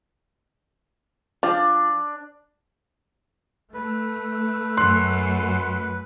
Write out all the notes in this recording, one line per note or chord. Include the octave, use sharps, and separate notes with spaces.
F3 D4
A3 B4
F#2 C6 F#6